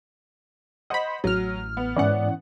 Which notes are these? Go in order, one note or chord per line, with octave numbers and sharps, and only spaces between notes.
C5 D#5 F#5 B5
A1 F#3 F6
B3
G#2 E3 C#4 D5 F#5